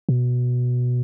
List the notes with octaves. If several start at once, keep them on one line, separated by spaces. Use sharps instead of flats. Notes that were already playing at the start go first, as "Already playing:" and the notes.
B2